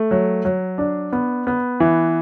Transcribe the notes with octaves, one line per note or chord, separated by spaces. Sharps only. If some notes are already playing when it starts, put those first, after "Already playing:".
Already playing: A3
F#3
F#3
D4
B3
B3
E3